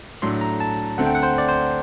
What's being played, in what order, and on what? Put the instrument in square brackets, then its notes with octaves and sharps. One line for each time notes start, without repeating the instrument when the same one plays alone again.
[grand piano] A2 F#3 A3 D4 A4 [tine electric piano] C6
[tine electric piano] A#5
A5
[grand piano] D2 D3 A3 C4 [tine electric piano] F#5
[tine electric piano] G5
F#5
C5
D5
C5